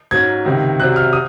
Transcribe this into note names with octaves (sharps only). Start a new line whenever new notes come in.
G#2 F#3 C#4 G#6
C#2 C3 D#3
C2 C3 F#3 C4 F#6
F6
D#6